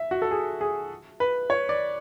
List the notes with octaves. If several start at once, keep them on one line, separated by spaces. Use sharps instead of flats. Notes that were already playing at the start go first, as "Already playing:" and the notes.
Already playing: E5
F#4
A4
G#4
G#4
B4
C#5
D5